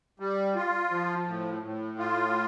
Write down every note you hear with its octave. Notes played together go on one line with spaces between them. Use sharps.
G3
F4
F3
A2
A2
F4